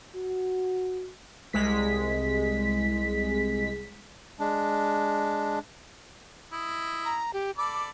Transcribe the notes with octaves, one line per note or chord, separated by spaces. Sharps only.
F#4
C2 G#3 B6
G#3 D4
E4 D#5
A#5
G4
A4 D5 B5 D6